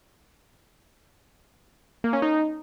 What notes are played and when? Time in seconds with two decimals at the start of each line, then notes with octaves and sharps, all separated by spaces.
2.04 A#3
2.13 C#4
2.22 D#4